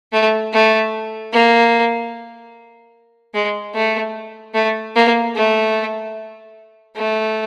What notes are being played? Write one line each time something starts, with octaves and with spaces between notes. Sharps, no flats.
A3
A3
A#3
G#3
A3
A3
A#3
A3
A3